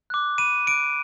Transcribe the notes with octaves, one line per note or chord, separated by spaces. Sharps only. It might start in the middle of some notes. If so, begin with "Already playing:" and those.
D6 F#6
B5 D#7
D6 F#6 D7